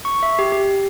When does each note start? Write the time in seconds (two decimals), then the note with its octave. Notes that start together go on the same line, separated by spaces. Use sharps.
0.05 C#6
0.23 E5
0.39 G4
0.52 G4